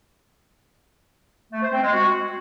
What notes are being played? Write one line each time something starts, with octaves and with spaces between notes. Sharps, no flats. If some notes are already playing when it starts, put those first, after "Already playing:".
A3
C5
C4
G#3
F#4